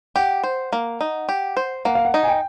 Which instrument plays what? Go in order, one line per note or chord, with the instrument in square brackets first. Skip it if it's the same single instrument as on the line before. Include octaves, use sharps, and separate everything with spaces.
[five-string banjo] G4 [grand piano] F#5
[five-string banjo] C5
A#3
D#4
G4
C5
[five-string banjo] A#3 [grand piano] F#5
[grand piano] F5
F#5
[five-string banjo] D#4
[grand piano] G#5
G5